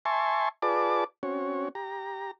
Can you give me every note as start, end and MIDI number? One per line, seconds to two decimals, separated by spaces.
0.05 0.49 76
0.05 0.49 80
0.05 0.49 81
0.05 0.49 84
0.05 0.49 85
0.62 1.04 65
0.62 1.04 68
0.62 1.04 71
0.62 1.04 74
0.62 1.04 81
0.62 1.04 86
1.23 1.69 60
1.23 1.69 61
1.23 1.69 66
1.23 1.69 73
1.75 2.31 67
1.75 2.31 82